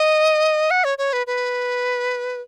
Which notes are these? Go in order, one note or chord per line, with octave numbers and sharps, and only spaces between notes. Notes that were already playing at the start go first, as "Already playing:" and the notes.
Already playing: D#5
F#5
C#5
C#5
B4
B4